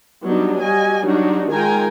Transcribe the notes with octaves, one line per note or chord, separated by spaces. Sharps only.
F#3 G3 B3 D4 D#4
G3 F#4 D#5 G#5
F#3 G3 D4 D#4 F#4
D#3 G#3 F4 G5 G#5 A#5